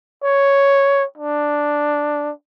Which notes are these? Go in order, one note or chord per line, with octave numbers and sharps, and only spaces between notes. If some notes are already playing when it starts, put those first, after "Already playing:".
C#5
D4